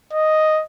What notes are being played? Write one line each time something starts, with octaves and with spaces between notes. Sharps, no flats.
D#5